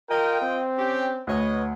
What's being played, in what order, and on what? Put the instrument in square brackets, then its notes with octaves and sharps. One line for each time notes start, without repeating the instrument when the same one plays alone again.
[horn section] F4 D#5 G5 [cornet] A#4
[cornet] C4
[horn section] C#4 G4
[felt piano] D2 [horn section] B4 C#5 D#5